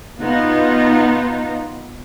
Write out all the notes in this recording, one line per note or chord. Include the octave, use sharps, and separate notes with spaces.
B2 B3 D#4 F4